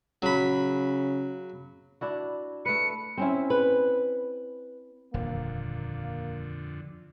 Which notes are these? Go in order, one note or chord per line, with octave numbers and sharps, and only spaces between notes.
C#3 F#3 B5
D4 E4 F#4
A3 B4 C#7
C4 C#4 E4
B4
D#1 F2 D3 A#3